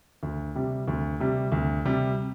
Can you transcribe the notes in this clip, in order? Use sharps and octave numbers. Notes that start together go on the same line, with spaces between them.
D2
C3 G3
D2
C3 G3
D2
C3 G3